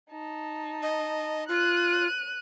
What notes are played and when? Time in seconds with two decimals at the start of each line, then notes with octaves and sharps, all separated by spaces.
0.11 D#4 A5
0.82 D#5
1.49 F4 F#6 D#7